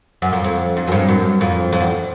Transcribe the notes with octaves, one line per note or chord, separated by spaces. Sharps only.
F#2
F2
F2
F2
F#2
G2
F#2
F2
F2
E2